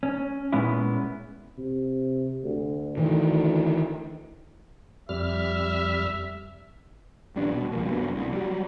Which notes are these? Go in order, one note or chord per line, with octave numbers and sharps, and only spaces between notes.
C#4
A#2 G#3 B3 C#4 E4
C3
D2
D2 D#3 E3
F2 G3 E5 F6
D#1 A#1 G3 D4
B2
C#2 F3 A#3
F#1 G2 B2
C2
F#3 G3